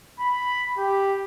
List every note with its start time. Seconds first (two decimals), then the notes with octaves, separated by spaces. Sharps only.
0.20 B5
0.78 G4